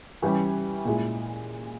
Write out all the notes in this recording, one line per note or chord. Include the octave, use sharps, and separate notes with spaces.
E3 G3 C#4 G4
A#2 G#3 E4